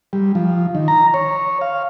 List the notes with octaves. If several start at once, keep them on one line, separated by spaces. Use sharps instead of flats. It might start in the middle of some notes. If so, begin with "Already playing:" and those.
G3
F3
D#3
A#5
C#5
F5